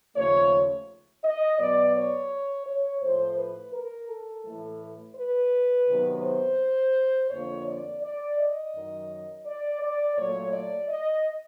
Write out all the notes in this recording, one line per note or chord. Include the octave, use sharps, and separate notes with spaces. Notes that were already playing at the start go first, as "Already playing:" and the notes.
D#2 C#3 F3 A3 C#5
D#5
B2 F#3 B3 D5
C#5
C#5
A2 F3 A3 C5
B4
A#4
A4
A2 E3 A3
B4
C3 D#3 F#3 B3
C5
F2 D3 F3 A#3 C#5
D5
D5
D#5
F#2 D#3 F#3
D5
D5
A#2 F#3 A3 C#5
D5
D#5